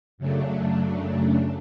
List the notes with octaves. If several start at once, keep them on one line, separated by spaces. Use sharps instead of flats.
F#2 C#3 F#3 A3 D4